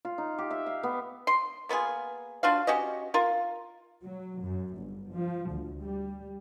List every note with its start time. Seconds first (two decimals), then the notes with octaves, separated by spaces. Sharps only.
0.05 F4
0.18 D#4
0.38 G4
0.51 E5
0.66 F5
0.83 B3
1.27 C6
1.69 A#3 B3 F4 G#4
2.43 D4 F4 F#4 F5
2.67 C#4 F#4 G4 D#5
3.14 F4 A#4
4.04 F#3
4.41 F#2
4.76 G1
5.13 F3
5.51 D2
5.82 G3